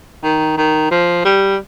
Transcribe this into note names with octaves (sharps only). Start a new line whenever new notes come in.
D#3
D#3
F3
G3